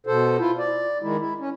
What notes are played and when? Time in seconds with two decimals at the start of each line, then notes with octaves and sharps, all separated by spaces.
0.07 B2 A4 C5
0.39 E4 F4
0.59 D5
1.03 D#3 G#3 E4
1.19 E4
1.40 C#4